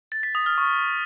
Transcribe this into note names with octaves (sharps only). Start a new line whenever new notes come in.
A6
B6
D#6
F6
C#6